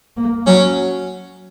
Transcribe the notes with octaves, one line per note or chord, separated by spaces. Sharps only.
A#3
F#3 C#4